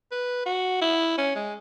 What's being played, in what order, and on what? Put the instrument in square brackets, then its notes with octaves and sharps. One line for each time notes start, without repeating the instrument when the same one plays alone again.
[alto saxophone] B4
F#4
E4
C#4
G#3